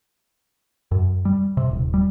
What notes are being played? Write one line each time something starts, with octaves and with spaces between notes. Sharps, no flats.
F#2
G3
C3
D#1
G3